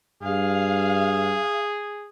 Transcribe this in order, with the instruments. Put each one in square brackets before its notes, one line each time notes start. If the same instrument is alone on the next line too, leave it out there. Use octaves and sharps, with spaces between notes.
[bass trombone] G2 [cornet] G#4 [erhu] F5